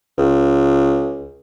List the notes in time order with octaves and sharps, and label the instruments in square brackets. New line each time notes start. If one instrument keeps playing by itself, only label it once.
[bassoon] C#2